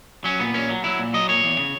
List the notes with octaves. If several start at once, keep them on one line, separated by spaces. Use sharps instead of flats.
F#3 C#4
A#2 B3
A#2 C#4
F#3
F#3 E4
A#2
F#3 D#5
A#2 C#5
E2
C#3